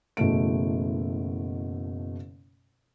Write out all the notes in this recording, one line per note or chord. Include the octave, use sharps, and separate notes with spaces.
F#1 B2 E3 A3 D7